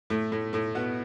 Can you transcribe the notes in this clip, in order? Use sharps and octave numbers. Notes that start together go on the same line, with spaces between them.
A2 A3
A2 A3
A2 A3
B2 B3